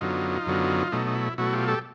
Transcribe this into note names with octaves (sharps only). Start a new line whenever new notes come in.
F#2 D3 F#3 B3 D#4 F4
F#2 D3 F#3 B3
B2 F#3 A3 D#4
D#4
E4
B2 F#3 A3 E4 F#4
F4 G4
G4 A4